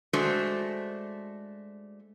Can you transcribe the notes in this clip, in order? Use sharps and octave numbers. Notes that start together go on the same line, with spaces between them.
G#3 A3 D4 F#4 A4 C5